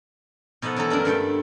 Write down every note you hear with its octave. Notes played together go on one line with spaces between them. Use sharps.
B2 F3 D#4 A4 F#5
E3 F#3 D#4 A4
F#2 A#3 D4 A#4
G2 A3 A4 G5